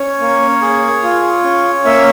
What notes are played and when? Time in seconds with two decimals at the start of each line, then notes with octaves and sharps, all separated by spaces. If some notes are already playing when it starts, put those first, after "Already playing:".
Already playing: C#4 C#5
0.20 A#3
0.62 G#4
1.03 F4
1.44 C#4
1.85 A#3 E5